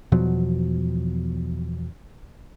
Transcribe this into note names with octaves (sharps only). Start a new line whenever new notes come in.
E2 B2 F3 F#3